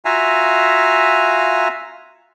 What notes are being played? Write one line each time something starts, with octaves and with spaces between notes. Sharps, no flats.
F4 F#4 E5 F5 G#5 A#5